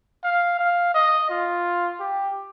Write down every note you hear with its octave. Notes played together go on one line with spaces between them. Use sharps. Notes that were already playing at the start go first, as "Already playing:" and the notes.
F5
F5
D#5
F4
G4